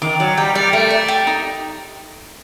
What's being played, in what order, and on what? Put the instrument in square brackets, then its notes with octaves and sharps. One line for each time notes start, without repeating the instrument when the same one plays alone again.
[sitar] D#3 [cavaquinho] D6
[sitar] F#3 [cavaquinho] D5
[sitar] G3 [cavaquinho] G5
[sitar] G3 [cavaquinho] D5
[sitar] A3 [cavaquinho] A#4
[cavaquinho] D5
G4
D#4